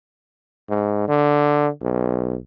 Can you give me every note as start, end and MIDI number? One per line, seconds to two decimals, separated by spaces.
0.69 1.05 44
1.08 1.68 50
1.83 2.36 35